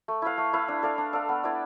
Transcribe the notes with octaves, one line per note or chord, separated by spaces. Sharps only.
A3
E4 B4 F5
A3
E4 B4 F5
D4
A4 D5 F5
D4
A4 D5 F5
B3
E4 B4 D5